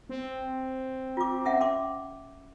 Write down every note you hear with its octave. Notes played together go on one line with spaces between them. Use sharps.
C4
F4 D6
C#4 E5 F#5
C#4 C6 D6